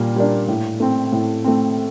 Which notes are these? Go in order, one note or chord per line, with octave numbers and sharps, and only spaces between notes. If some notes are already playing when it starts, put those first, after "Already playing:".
Already playing: A#2 G3 A#3
G3 A#3 D4
A2
A3 C4
A2
A3 C4